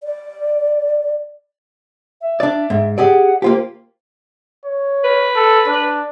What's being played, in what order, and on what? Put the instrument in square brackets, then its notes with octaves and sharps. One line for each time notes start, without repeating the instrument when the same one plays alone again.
[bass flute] D5
[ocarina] E5
[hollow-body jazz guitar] D4 D5
G#2
[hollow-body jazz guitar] G4 G#4 D5 [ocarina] F#5
[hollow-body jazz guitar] A#3 F4 G4 [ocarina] C5
[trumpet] C#5
[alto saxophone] B4
[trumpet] A4
D4